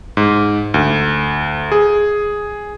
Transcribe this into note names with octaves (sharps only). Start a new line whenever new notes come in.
G#2
D2
G#4